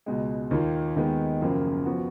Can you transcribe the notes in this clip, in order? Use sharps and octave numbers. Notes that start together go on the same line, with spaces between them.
C#2 B2 G#3
D#2 D#3 A#3 F4
D#2 D#3 G#3 B3
F#1 F#2 C#3 F3 A#3
F3 B3 F#4